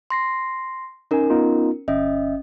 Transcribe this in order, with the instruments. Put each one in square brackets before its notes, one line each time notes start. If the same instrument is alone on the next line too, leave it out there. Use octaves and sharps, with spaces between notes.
[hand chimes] C6 A#6 C7
[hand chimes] C#4 A#4 [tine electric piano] D#4 G#5
[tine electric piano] B3 D#4 F4
[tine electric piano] G1 E5 [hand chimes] C#4 D#5